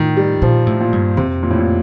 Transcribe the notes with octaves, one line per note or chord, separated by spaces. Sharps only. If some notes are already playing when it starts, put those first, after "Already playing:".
Already playing: A2 D#3
G3
A#2 F3
A2
A#2
G2
F2 C3
A#2
A2
A#2